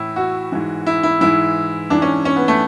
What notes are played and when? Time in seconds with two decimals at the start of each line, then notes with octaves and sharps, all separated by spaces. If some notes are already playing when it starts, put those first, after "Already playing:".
Already playing: A2 E3 E4
0.16 F#4
0.52 G#2 E3
0.86 E4
1.03 E4
1.21 G#2 E3 E4
1.90 G#2 E3 D4
2.02 C#4
2.25 C#4
2.36 B3
2.48 A3